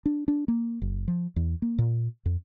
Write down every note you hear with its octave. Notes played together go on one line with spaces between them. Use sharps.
D4
D4
A#3
F#1
F3
E2
A#3
A#2
F2